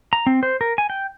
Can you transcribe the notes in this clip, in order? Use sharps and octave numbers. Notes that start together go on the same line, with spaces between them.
A#5
C4
C5
A#4
G#5
G5